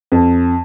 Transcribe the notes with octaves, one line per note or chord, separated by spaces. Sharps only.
F2